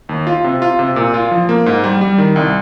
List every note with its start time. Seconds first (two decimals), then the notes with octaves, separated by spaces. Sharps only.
0.09 D#2
0.27 F4
0.44 C3
0.62 F4
0.79 C3
0.96 A#2
1.14 F4
1.31 F3
1.49 A#3
1.66 G#2
1.84 G3
2.01 G3
2.18 D#3
2.36 C2